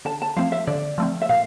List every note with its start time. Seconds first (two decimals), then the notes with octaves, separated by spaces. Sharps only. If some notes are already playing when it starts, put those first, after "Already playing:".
0.05 D3 A5
0.22 A5
0.36 F3 A3 C4 F5
0.52 E5
0.67 D3 D5
0.98 F3 A3 C4
1.22 E5
1.29 A#2 F5